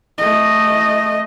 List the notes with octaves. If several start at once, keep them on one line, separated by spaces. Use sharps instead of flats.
A3 D#5